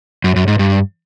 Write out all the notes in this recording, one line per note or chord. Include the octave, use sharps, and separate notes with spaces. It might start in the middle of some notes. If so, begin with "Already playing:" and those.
F#2
F#2
G#2
G2